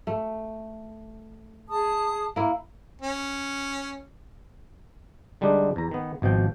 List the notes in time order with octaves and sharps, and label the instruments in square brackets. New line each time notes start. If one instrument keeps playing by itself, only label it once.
[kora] A3
[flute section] G#4 A5 D#6
[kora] A#3 E4
[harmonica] C#4
[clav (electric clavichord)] D3 G3 G#3 D4 D#4
E2 A#5
D#3 B3
G#1 B2 F3 G5